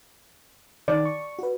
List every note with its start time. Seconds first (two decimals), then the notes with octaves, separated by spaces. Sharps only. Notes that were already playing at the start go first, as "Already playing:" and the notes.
0.88 D#3 D5
1.05 C#6
1.39 F#4 B4